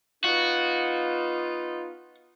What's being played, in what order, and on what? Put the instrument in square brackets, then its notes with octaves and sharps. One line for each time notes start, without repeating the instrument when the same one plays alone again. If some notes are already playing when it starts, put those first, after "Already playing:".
[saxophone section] B3 D#4 F4 [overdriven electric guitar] F#4